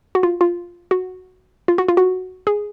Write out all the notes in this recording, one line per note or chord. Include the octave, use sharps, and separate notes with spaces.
F#4
F4
F4
F#4
F4
F#4
F4
F#4
G#4